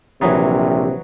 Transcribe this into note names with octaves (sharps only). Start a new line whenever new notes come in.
A#1 C3 E3 F#3 D#4